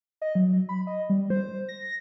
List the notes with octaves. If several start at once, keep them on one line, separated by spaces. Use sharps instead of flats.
D#5
F#3
B5
D#5
G3
C5
A#6